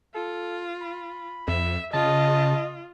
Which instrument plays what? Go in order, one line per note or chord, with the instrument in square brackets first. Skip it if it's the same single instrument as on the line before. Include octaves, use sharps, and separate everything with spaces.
[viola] F4 [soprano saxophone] A4
[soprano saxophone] B5
[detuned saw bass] F2 [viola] E5
[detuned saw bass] C#3 [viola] F4 [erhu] D#5 [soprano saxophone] A5